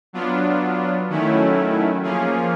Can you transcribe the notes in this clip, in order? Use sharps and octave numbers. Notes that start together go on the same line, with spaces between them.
F#3 B3 D4 F4
D#3 F#3 A3 C#4 E4
F3 A#3 C#4 F4 G#4